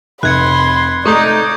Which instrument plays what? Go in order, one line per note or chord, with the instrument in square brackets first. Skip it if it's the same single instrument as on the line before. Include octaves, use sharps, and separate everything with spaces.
[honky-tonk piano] F1 [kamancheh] B5 C6 [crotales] F#6 G#6 C#7
[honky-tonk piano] A3 [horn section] D#4 [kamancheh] D5 [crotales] C#6 D#6 G6